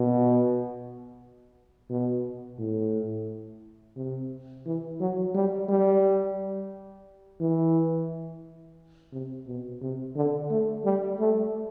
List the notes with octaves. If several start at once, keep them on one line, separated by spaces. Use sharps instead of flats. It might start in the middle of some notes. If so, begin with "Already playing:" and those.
Already playing: B2
B2
A2
C3
E3
F#3
G3
G3
E3
C3
B2
C3
D3
A3
G3
A3